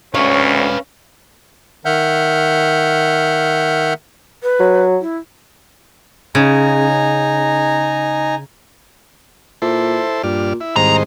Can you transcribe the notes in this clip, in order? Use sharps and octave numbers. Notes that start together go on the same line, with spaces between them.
D2 C#4 B4 C#5 F5
D#3 E5 F#5 F6 G6
B4
F#3
E4
C#3 D#4 G#5 A#5
A#2 E4 A4 C5
G2 A#2 D4 F6
E4
C2 G#2 D#3 C5 A#5